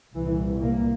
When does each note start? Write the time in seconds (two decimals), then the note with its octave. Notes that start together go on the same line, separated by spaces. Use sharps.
0.14 C2 A#2 E3
0.62 A#3